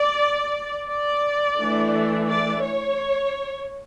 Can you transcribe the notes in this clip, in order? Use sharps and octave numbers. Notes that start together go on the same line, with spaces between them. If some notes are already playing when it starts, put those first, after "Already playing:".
Already playing: D5
D5
E3 A3 D4
D5
C#5